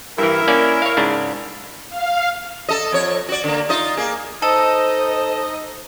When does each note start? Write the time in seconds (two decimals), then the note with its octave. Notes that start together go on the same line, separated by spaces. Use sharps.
0.18 G2 E3 E4 A#4
0.48 A#3 C#4 D5
0.82 C#5 F5
0.97 G#2 C#3 D4
1.90 F5
2.69 A4 D#5
2.92 F2 C#5
3.29 F#4 D5
3.44 D3 A#3
3.69 D#4 F4 D#5
3.97 A#3 G#4
4.42 D#4 A4 C5 D#5